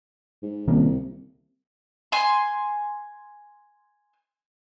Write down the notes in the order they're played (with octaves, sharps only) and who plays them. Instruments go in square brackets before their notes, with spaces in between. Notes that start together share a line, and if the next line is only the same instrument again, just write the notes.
[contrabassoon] G#2
[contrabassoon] C2 [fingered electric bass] D#3 A#3 C#4
[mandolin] G#5 C6